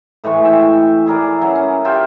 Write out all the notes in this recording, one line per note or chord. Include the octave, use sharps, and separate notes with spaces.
A2 E3 G#3 C#6
E5 G5
E4 G#4 A#4 D5
F#3 C#4
C#4
F4 G4 E5 G5